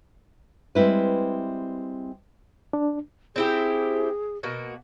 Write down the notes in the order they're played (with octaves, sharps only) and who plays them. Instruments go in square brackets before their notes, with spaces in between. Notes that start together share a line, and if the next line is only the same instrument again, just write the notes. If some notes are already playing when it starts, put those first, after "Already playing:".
[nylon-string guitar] G3 G#3 C4 E4 B4
[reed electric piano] D4
[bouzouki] C4 E4 G4 [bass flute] G#4
[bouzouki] B2 A#3 F#4